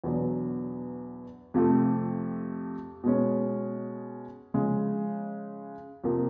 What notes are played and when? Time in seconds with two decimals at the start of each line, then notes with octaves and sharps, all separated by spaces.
0.04 E2 B2 F#3 B3 D4
1.54 F2 C3 F3 A3
3.04 B2 G#3 C#4
4.54 C#3 F3 G#3
6.04 F2 C3 F3 A#3